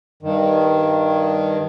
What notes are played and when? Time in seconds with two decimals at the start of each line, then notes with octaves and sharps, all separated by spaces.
0.23 G2 D#3